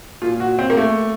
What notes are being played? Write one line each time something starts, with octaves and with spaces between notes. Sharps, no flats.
A#2 F4
F#4
C4
A#3
A3